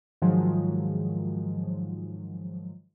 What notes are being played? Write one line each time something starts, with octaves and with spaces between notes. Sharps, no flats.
G#2 D#3 F3 F#3 G#3